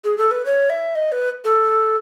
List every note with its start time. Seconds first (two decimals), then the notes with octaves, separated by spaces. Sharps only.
0.04 G#4
0.18 A4
0.31 B4
0.46 C#5
0.70 E5
0.95 D#5
1.12 B4
1.44 A4